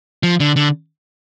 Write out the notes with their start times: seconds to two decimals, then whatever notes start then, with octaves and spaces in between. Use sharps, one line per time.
0.23 F3
0.40 D3
0.56 D3